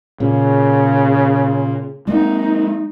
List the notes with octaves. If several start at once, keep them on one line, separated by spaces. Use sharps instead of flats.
A#2 C#3
G#3 A#3 D#4